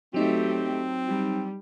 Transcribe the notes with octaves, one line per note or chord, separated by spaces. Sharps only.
F#3 A3 C4 D#4 G4
G3